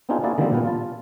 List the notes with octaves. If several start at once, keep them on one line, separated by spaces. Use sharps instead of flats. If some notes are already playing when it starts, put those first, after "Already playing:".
B3 C4 D4 D#4 F4 G#4
A#3 E4 F#4 G#4 D5
D3 D#3 F3 G3 A#3 C4
A#2 B3
F4 A5